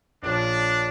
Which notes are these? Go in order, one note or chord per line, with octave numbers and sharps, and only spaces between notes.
A#1 A#2 F3 C#4 D4